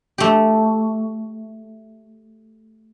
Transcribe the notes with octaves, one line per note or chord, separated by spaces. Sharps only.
A3 G4